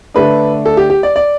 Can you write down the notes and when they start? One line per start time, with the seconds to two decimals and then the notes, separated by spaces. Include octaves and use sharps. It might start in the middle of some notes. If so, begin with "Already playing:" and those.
0.14 D3 A3 D4 B4
0.66 A4
0.77 G4
0.90 G4
1.03 D5
1.16 D5